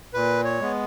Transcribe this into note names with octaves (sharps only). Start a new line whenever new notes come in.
A#2 B4
C#5
G#3 B3